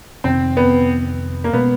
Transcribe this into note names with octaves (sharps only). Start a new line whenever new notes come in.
F2 C3 D#3 C4
B3
A#3
B2 G#3 B3 C#4